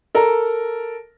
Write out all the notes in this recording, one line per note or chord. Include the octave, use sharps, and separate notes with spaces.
A4 A#4 A#5